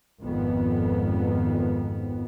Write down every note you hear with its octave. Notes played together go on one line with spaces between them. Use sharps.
G#1 F2 B3